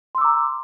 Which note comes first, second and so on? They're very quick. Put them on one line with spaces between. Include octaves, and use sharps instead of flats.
C6 E6 D6 A#5